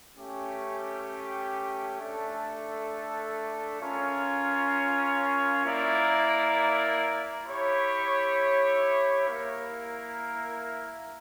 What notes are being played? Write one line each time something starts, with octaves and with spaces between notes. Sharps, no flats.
A3 C#4 G4
A3 D4 A4
C#4 F4 A#4 C#5
A#3 E4 A#4 D5
E4 G4 C#5
A#3 E4 A#4